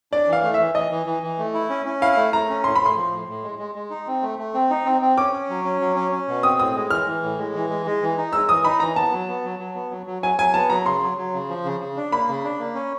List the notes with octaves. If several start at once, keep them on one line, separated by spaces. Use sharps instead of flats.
D4 D5
E3
F5
A3
E5
E3
E3 D#5
E3
E3
E3
A3
E4
C#4
C#4
E4 F5
A3
A3 A#5
C#4
A2 C6
A2 B5
C6
F3
A2
A2
G#3
G#3
G#3
D#4
C4
A3
A3
C4
D#4
C4
C4
C#4 D6
C#4
F#3
C#4
F#3
C#4
C#4
B2
C4 D#6
A2 D#6
G#3
E3 F6
E3
A2
G#3
E3
G#3
G#3
E3
D#4
G#3 E6
E3 D#6
D#4 B5
E3 A#5
B3 A5
F#3
B3
F#3
F#3
B3
F#3
F#3
F#3 G#5
F#3 G#5
B3 A5
F#3 A#5
C#3 C6
F#3
F#3
C#3
F3
C#3
C#3
D4
A#3 B5
C#3
D4
A#3
C#4